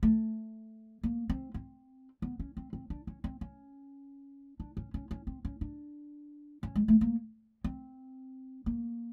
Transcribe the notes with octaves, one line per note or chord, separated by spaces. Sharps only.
A3
A#3
C4
C4
B3
C#4
C4
C4
D4
C#4
C4
C#4
D4
C#4
C#4
C#4
C4
C#4
D4
C#4
G#3
A3
A#3
C4
A#3